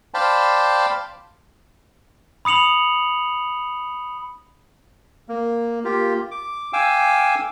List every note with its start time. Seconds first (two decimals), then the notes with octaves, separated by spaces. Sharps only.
0.14 C5 D5 F5 G5 A5 B5
2.45 B5 D#6 C#7 F7 F#7
5.29 A#3
5.85 A#3 F4 G4
6.31 D6
6.73 F5 G5 G#5 D6 E6